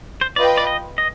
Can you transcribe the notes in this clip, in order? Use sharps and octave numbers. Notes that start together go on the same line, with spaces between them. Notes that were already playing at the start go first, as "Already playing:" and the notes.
C5
F4 B4 D5 D#5 G5
D5
D#5
D#5